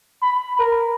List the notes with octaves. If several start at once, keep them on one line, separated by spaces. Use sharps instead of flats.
B5
A#4